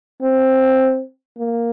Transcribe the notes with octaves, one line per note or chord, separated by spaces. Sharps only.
C4
A#3